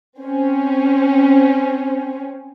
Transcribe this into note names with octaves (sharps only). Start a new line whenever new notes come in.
C4 C#4